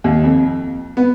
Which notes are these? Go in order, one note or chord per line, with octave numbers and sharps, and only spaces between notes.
D#2
F2
B3